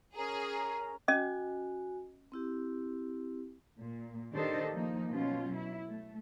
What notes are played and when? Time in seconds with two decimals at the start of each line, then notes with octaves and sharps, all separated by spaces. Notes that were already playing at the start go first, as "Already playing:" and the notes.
0.16 C#4 G#4 A#4 A#5
1.08 C#4 F#4 D#5 G#5 D6
2.32 C4 E4 G4
3.79 A#2
4.31 D#3 D4 G4 A4 C5 D#5
4.71 F3 A#3 D#4
5.11 B2 F#3 C#4 F4
5.54 E4
5.87 A3